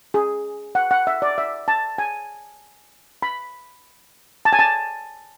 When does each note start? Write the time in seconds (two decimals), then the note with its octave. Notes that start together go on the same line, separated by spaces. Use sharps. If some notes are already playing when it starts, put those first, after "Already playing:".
0.14 G#4
0.75 F#5
0.91 F#5
1.07 E5
1.22 D5
1.38 E5
1.68 A5
1.98 G#5
3.22 B5
4.45 A5
4.53 G#5
4.59 A5